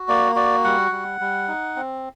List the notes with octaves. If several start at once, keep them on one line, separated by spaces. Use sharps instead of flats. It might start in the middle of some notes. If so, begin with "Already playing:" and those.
Already playing: F#4
A#3 D5
F#4 D5
G3 F#5
G3
G3
D#4
C4